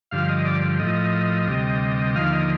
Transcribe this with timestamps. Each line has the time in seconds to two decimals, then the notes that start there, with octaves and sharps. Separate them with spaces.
0.11 G2 D3 F3 F5
0.29 D#5
0.45 D5
0.79 A2 F3 D#5
1.47 D2 C3 G3
2.16 D#2 D3 F3 F5
2.33 D#5